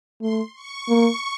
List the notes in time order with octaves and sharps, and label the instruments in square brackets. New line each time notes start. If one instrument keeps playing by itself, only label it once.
[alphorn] A3 [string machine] C6
[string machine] C#6
[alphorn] A#3